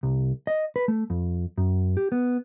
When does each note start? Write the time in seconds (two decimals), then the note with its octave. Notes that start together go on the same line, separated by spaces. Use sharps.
0.03 C2
0.47 D#5
0.76 B4
0.88 A3
1.10 F2
1.58 F#2
1.97 G4
2.12 B3